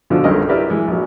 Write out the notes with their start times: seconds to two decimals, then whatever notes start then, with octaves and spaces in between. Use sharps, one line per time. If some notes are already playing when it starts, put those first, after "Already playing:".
0.10 B2 D3 F3
0.24 B1 G2 C#3 A#4 D#5
0.49 E4 G4 A#4 B4 D5 E5
0.70 E3 G#3
0.88 A#1 F#3